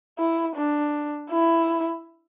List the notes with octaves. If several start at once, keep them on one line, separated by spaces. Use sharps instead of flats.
E4
D4
E4